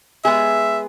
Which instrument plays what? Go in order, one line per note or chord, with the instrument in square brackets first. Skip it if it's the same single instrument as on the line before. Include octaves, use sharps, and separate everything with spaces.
[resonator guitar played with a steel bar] G#3 B3 G#4 [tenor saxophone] E5